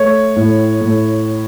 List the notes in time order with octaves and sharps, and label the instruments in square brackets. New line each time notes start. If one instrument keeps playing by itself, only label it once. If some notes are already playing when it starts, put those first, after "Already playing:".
Already playing: [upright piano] A3 C#5
A2
A2